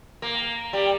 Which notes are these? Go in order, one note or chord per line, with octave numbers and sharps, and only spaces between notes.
A#3
G3